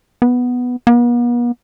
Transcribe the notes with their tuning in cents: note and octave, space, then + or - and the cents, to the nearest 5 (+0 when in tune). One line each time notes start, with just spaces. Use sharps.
B3 +0
B3 -45